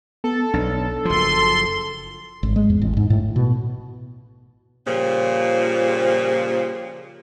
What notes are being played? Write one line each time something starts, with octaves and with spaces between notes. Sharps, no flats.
B3 A4
B1 D4
F#1 F3 C6
G#1
G#3
E2
A1
G#2
A2
B2
A#2 C#3 F3 G3